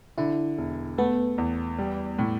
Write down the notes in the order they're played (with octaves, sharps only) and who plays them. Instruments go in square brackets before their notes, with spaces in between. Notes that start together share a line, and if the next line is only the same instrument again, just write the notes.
[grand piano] D3 [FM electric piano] E4
[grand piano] E1
[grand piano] A3 [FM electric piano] B3
[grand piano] E2
G3
A2